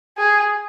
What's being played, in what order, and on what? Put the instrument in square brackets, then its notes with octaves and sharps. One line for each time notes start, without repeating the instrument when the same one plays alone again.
[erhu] G#4